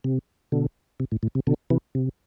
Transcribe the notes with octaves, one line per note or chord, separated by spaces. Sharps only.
C3
B2 D3
C3
A2
A2
C3
B2 D3
C3 E3
C3